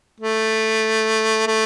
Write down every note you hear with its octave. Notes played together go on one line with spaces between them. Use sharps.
A3
A3